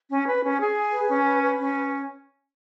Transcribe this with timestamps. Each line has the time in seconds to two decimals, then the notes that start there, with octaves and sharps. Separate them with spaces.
0.10 C#4
0.27 B4
0.43 C#4
0.60 G#4
0.76 G#5
0.93 B4
1.09 C#4
1.26 B4
1.43 B4
1.59 C#4